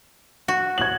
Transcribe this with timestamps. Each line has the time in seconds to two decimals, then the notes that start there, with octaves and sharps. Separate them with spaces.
0.48 F#4
0.78 G#6 F#7